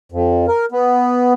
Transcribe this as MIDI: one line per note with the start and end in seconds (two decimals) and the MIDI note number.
0.12 0.46 41
0.48 0.65 70
0.72 1.33 59